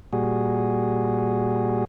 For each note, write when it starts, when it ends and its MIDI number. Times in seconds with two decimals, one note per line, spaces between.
0.13 1.85 46
0.13 1.85 55
0.13 1.85 66
0.13 1.85 68